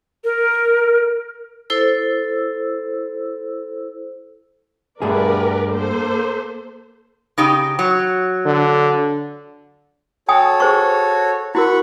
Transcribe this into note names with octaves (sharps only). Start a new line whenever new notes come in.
A#4
E4 A4 C5 E6
G2 A3 G#4 A#4 B4 D5
A#3 A4 C5
C#3 D#4 G4
F#3
D3
F#4 A4 C#5 G5 G#5 D#6
G#4 C5 C#6
E4 F#4 A#4 F#5 B5 C#6